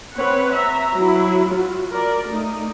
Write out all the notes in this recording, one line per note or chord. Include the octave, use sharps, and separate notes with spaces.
C4 B4 C#5 F#5
E5 A#5
F#3 E4
F4 F#4
A#4 D5
A3 D#4